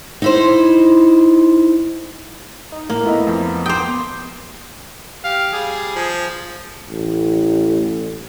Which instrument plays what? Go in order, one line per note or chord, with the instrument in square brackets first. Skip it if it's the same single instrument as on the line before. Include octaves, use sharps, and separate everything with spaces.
[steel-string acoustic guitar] D#4 E4 C5
[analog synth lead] D#4
[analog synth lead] A2 [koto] A#3
[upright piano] A3 E4 D#5 [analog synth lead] B3
[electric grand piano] F2 F3
[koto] C5 G5 [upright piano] D6 D#6
[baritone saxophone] G4 [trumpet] F5
[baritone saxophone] G3 [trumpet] G#4
[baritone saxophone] F3
[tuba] A1